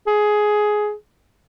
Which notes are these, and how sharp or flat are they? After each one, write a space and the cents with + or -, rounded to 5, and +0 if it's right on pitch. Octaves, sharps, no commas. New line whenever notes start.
G#4 +10